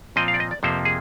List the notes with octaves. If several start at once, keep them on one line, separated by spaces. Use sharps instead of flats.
A#2 F3 C4 D#5
F5
D5
D#5
D5
F2 C3 F3 A#3 C5
G#4